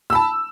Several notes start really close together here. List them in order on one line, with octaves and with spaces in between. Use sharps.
E6 B5 A5